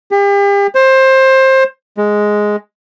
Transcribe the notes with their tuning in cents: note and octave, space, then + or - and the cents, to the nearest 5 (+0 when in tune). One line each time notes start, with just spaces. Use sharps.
G4 +40
C5 +20
G#3 +5